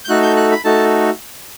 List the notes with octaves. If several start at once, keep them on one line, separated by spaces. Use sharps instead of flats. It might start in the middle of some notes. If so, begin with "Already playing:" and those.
G6
A3 D#4 F#4 A4 F#6
G6
F#6
B5
A3 D#4 F#4 A4 A5